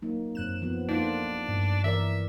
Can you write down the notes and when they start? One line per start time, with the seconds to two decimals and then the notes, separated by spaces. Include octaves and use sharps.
0.02 F#3 A#3 D#4
0.35 F#2 C4 F#6 E7
0.62 F3 B3
0.89 A3 A#3 D4 D#4 F4
1.49 G2
1.84 E3 A#4 D5 E5